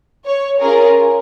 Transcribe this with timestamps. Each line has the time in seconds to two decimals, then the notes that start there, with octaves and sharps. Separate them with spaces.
0.26 C#5
0.61 C#4 F4 G#4 A#4